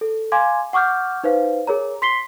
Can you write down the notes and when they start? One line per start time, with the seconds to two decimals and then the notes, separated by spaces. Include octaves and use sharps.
0.01 A4
0.32 F5 G#5 C6 D6 G#6
0.73 F#5 C#6 D6 F6 G6
1.24 D#4 B4 C5 F5
1.67 G#4 A#4 C#5 A#5
2.02 C6 B6 C7 G7